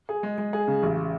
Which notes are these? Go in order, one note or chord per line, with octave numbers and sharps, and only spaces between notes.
G#4
G#3
G#3
G#4
C#3
A1